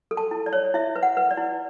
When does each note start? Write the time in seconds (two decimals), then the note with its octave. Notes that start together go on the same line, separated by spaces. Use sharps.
0.11 A4
0.17 A5
0.31 E4
0.46 D5
0.53 C#5
0.74 E4 E5
0.96 B4
1.03 F#5
1.17 B4
1.31 D5
1.37 E4